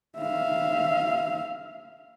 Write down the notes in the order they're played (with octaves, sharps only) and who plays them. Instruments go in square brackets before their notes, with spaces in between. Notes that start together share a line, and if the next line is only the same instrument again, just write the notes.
[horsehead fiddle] E5 F5